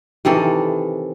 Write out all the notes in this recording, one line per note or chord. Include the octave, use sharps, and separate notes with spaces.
C3 D#3 E3 A4